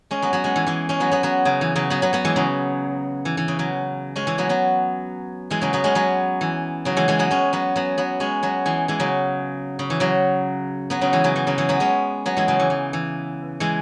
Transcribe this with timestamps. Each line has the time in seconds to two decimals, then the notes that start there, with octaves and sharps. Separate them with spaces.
0.11 G#3 C#4
0.22 F#3 B3
0.33 F#3 B3
0.44 G#3 C#4
0.56 E3
0.66 E3 G#3
0.89 G#3 C#4
1.00 F#3 B3
1.11 F#3 B3
1.23 F#3 B3
1.45 C#3 F#3
1.61 E3
1.75 C#3 F#3
1.90 F#3 B3
2.02 F#3 B3
2.13 F#3 B3
2.25 E3 G#3
2.36 C#3 F#3
3.25 E3
3.37 E3
3.48 C#3
3.59 C#3 F#3
4.16 G#3 C#4
4.27 E3 G#3
4.38 F#3 B3
4.49 F#3 B3
5.50 E3 G#3
5.61 C#3 F#3
5.73 F#3 B3
5.84 G#3 C#4
5.95 F#3 B3
6.41 E3
6.85 C#3 F#3
6.97 E3 G#3
7.08 E3 G#3
7.19 F#3 B3
7.31 G#3 C#4
7.53 F#3 B3
7.76 F#3 B3
7.98 F#3 B3
8.20 G#3 C#4
8.43 F#3 B3
8.66 E3 G#3
8.88 E3 G#3
9.00 C#3 F#3
9.79 C#3
9.90 E3
10.00 C#3 F#3
10.90 F#3 B3
11.01 C#3 F#3
11.13 E3 G#3
11.24 C#3 F#3
11.36 E3
11.47 C#3 F#3
11.58 E3 G#3
11.69 F#3 B3
11.80 G#3 C#4
12.26 F#3 B3
12.37 E3 G#3
12.48 C#3 F#3
12.60 E3
12.70 E3
12.93 E3
13.60 E3 G#3